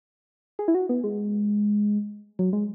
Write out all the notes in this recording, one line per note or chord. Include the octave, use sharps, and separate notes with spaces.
G#4
E4
F#4
B3
G#3
F#3
G#3